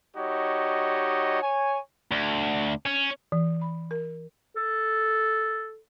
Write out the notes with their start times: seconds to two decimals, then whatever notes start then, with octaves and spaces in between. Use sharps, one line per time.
0.17 G3 D#4 F#4 G4 C#5 D#5
1.42 C#5 G#5
2.12 D2
2.86 C#4
3.32 E3
3.62 B5
3.91 A#4
4.56 A4